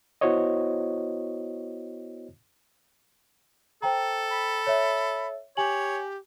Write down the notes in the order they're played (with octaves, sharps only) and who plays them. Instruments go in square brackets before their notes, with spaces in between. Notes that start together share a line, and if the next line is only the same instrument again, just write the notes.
[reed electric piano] B3 E4 F#4 C5 C#5 D#5
[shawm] A4 [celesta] C5 G5 A#5
[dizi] B5
[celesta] C#5 E5
[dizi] G4 [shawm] C#5 [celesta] G#5 F#7